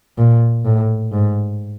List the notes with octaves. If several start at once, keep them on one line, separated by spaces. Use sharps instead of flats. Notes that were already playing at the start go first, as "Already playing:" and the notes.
A#2
A2
G#2